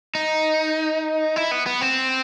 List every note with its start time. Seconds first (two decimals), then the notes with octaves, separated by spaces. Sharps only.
0.15 D#4
1.36 E4
1.51 B3
1.66 B3
1.81 C4